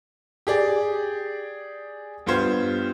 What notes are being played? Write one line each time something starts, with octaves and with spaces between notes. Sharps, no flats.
G4 G#4 D5
G2 B3 F4 G4 C5 G#6